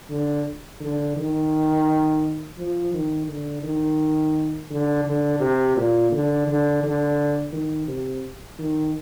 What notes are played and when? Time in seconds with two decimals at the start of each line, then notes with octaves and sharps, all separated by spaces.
0.10 D3
0.81 D3
1.16 D#3
2.58 F3
2.93 D#3
3.28 D3
3.63 D#3
4.70 D3
5.05 D3
5.40 C3
5.77 A#2
6.12 D3
6.47 D3
6.83 D3
7.53 D#3
7.88 C3
8.59 D#3